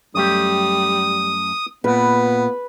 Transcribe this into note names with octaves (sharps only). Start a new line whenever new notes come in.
F#2 G3 A3 G4 D#6
A#2 B3 B4